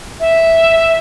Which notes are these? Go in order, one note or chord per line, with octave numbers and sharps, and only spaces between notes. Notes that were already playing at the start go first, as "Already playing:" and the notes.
E5